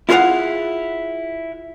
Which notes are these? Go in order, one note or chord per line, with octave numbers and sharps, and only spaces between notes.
E4 F4 G#4 A4 F5 F#5